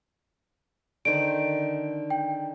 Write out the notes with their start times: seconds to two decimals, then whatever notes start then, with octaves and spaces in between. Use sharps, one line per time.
1.05 D3 D#3 C5 D7
2.10 G5